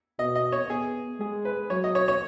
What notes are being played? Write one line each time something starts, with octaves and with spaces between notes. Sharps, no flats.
B2 D#5
D#5
C#5
B3 G#4
G#3 G#4
B4
F#3 C#5
D#5
C#5
C#5